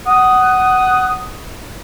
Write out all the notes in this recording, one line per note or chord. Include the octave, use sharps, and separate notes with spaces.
F#5 D#6